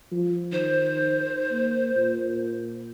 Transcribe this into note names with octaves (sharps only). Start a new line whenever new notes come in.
F3
D#3 C5
A#3
A#2